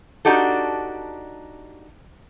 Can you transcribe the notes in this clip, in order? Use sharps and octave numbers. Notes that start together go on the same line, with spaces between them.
D4 D#4 F#4 G4 A4